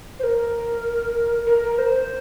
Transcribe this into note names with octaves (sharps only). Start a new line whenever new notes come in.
C5
A#4
A#4
A#4
C5
C5